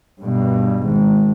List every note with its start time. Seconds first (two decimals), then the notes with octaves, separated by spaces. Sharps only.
0.21 G2 B2
0.84 G#1